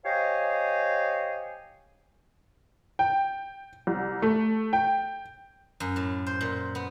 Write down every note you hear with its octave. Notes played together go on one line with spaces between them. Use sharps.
G4 C5 C#5 D#5 F5 G#5
G5
C2
A3
G5
F#2
A2
C5
A#2
B3